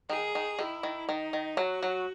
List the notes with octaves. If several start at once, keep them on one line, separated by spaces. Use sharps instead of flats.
D#3 G#4
D#3
D#3 E4
D#3
D#3 D#4
D#3
F#3 F#4
F#3